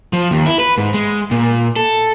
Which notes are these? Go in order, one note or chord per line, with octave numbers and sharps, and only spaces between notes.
F3
D#2
E4
B4
G#2
G#3
A#2
A4